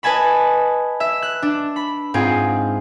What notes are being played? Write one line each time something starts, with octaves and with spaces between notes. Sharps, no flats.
B4 D#5 G#5 A5 B5
E5
F#6
D4
B5
G#2 C4 F4 G#4